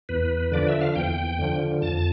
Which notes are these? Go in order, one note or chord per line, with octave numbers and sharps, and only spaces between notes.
E2 B4
D3 F3 D5
E5
F5
E2 G5
D3 F3
F2 A5